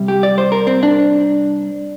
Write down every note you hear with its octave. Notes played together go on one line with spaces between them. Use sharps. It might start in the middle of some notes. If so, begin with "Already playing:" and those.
Already playing: C3 G3
G4
D5
C5
A#4
C4
D4